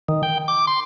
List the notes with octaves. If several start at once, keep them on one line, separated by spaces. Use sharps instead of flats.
D#3
G5
D6
C6